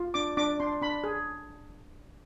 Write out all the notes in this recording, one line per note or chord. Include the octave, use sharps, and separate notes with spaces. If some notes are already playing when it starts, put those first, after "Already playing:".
Already playing: F4
D4 D6
D4 D6
D4 C6
D4 B5
G#4